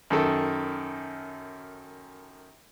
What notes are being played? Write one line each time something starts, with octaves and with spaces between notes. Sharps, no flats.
F#2 D#3 A4